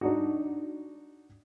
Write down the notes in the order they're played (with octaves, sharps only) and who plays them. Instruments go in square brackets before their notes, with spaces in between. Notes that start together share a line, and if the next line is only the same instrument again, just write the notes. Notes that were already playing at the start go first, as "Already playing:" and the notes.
[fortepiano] D4 D#4 F#4